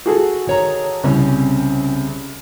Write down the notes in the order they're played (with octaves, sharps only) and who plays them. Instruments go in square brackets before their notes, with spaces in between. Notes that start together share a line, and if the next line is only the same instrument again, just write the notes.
[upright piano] F#4 G#4 A4
[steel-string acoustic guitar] D#3 C#5 A#5
[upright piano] C2 [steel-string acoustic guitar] C#3 C4 C#4